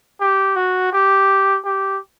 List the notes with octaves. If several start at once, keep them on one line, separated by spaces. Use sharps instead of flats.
G4
F#4
G4
G4